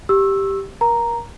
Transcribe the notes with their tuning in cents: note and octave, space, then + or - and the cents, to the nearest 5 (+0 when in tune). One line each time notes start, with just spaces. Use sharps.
G4 +0 C#6 -35 E6 +0
A#4 +25 A#5 +0